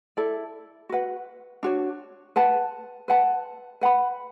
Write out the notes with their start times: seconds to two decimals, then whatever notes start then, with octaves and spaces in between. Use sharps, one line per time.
0.17 E4 A4 D5
0.89 F#4 B4 F#5
1.63 D4 F#4 C#5
2.36 B4 F#5 A5
3.08 B4 F#5 A5
3.81 B4 F#5 B5